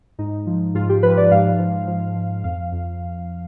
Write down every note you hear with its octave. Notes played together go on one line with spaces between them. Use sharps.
G#2 D#4
F3
G#2 F4
G4
F3 B4
D5
G#2 F5
F3
F3
F3
F2 F5
F2